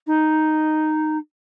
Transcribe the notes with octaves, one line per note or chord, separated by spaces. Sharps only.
D#4